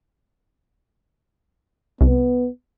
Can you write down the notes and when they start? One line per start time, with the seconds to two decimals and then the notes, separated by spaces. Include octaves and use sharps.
2.01 C2 B3